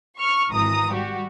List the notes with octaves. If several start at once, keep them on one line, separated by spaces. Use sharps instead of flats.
C#6 F6
G#1 E3 A#5 D#6
G3 F#4 G4